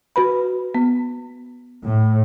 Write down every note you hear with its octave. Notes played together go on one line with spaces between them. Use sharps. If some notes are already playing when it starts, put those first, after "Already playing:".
F#4 B4 B5
B3
A2